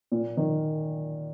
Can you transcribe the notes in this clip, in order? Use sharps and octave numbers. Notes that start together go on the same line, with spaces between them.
A#2
D#3